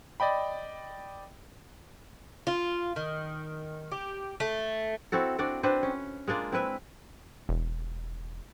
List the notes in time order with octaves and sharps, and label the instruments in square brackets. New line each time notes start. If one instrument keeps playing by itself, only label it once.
[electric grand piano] D5 D#5 G5 B5
[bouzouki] F4
D#3
G4
A3
[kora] C4 E4 F#4 A4
C4 D4 F#4 D5
C4 D4 B4 C5
C#4
G#3 A#3 D4 F4
C4 E4 B4 E5
[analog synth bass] E1